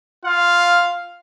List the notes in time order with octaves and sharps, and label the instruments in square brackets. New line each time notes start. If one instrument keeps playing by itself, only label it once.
[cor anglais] F4 [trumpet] F5